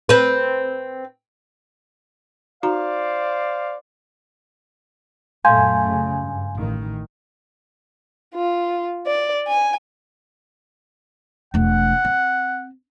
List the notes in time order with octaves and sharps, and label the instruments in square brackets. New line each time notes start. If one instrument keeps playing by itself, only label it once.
[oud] C4 B4
[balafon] D#4 F#4 A#5 [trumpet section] C5 D5 [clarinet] F5
[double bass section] F#2 A#2 A3 [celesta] F5 C6 G6 [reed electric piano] G#5
[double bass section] C#3
G2
A1 D#3
[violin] F4
D5
G#5
[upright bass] E1 A3 [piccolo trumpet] F#5
[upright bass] C4